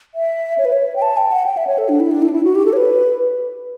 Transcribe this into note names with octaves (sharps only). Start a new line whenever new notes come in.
E5
C#5
B4
C#5
G5
A5
G5
F#5
G5
E5
C#5
A4
D4
E4
D4
E4
D4
E4
F#4
G4
A4
C#5
B4